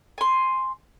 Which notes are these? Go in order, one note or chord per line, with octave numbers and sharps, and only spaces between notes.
G#5 C6